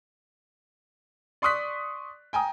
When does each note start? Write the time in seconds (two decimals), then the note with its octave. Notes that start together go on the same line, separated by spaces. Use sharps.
1.42 D5 C6 C#6 D#6 F#6 B6
2.33 G5 G#5 A#5 D#6